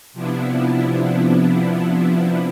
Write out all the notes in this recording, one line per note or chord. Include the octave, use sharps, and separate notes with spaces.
C3 F3 B3 D4 E4